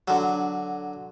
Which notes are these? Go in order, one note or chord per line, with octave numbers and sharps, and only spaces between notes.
D3 F#3